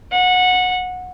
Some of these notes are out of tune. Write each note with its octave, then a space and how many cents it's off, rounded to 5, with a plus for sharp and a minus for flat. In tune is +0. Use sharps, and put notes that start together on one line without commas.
F#5 -20